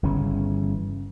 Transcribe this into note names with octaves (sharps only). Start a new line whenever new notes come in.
G1 C#3 E3 C#4